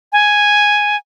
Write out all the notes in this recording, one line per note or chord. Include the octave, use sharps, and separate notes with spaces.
G#5